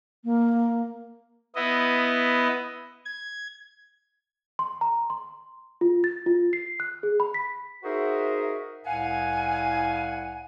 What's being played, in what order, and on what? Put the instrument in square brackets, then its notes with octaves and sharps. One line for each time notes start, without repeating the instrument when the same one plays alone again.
[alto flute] A#3
[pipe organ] B3 E4 D#5
G#6
[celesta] C6
A#5
C6
F4
A6
F4
C7
F#6
G#4
B5
B6
[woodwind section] D#4 F#4 G#4 A#4 C5 E5
C2 A2 F5 F#5 G#5